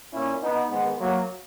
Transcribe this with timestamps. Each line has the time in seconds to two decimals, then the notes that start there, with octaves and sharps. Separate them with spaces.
0.13 A#2 C#4 E4
0.42 B3 D#4
0.70 G#2 D#3 G#3 B3
0.99 F#3 A#3